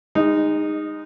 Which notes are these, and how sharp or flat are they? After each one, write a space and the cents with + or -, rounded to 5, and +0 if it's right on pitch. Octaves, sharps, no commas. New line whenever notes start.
G#3 -35 D#4 -10